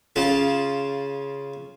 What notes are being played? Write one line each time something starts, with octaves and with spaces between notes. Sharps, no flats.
C#3 F4 A5